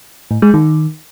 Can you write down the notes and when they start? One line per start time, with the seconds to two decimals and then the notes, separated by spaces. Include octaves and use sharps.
0.31 A2
0.42 G#3
0.54 D#3